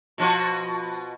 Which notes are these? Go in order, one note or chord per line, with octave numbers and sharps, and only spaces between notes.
B2 F3 F#4